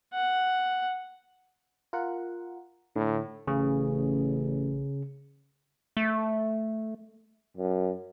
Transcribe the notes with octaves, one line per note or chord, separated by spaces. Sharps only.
F#5
F4 A#4 F#5
A2 D3
A1 C#3
A3
F#2